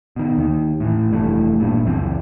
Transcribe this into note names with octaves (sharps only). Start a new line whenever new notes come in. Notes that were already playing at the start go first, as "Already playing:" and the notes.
B2 D#3
D#2 D#3
A2 E3
F1 G2 E3 A3
G#1 G2 A#2
C#2 F#2 E3 C4